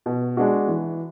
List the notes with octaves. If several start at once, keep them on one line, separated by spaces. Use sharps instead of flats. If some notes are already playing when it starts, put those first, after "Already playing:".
B2
G#3 D4 F#4
E3